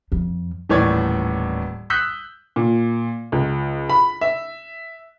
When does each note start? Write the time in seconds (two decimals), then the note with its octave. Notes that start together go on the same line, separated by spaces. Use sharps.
0.12 F2
0.69 D#1 A2 E3 C#5 D5 G#6
1.90 D#6 E6 F#6 G6 B6
2.56 A#2
3.32 C#2
3.90 B5
4.21 E5